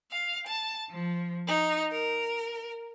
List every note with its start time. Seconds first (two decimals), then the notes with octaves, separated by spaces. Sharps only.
0.11 F5
0.47 A5
0.90 F3
1.47 D#4
1.91 A#4